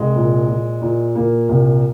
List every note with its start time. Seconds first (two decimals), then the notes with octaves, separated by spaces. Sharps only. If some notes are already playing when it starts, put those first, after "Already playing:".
Already playing: C2 G#3
0.16 A#2
0.49 A#2
0.82 A#2
1.15 A#2 A#3
1.49 C2 A#3